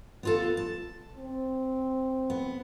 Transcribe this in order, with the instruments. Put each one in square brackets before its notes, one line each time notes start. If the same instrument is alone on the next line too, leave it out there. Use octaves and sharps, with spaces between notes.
[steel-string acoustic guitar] B3 F4 A4
A5
[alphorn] C4
[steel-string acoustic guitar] B3